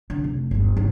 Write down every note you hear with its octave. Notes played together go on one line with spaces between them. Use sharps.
D3
F1
G1 E2
G#1 C#3